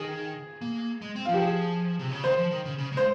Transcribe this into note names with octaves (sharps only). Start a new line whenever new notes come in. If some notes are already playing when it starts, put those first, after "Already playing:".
Already playing: D#3 G#4
A#3
G#3
C4
F3 F4
G4
G#4
C3
C#3
D#3 C5
F3
D#3
C#3
C#3
G#3 C5